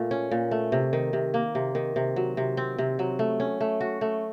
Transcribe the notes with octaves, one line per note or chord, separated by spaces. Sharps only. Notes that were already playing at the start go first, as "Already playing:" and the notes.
Already playing: A#2 A3
C#4
A#2
A3
C3
D#3
C3
A#3
C3
D#3
C3
F#3
C3
C4
C3
F#3
A3
C#4
A3
F#4
A3